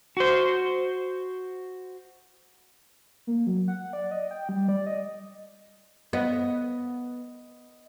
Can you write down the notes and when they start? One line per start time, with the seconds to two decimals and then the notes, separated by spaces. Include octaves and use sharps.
0.17 F#4 C5
3.27 A#3
3.47 F#3
3.68 F#5
3.93 D5
4.11 D#5
4.31 G5
4.49 G3
4.69 D5
4.86 D#5
6.13 B3 D#5